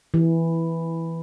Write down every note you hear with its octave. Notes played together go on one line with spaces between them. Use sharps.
E3